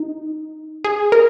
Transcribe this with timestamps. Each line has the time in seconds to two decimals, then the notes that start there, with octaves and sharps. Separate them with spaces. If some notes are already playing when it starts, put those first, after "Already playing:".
Already playing: D#4
0.84 G#4
1.12 A#4